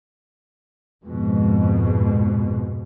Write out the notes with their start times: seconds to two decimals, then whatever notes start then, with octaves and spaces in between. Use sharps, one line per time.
1.04 F2 G#2 B2